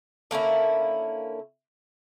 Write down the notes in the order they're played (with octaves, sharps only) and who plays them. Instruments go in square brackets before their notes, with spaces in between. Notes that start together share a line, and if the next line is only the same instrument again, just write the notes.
[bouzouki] D3 A#3 C#4 E4